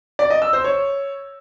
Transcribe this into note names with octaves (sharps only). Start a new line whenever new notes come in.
D5
D#5
E6
C5
C#5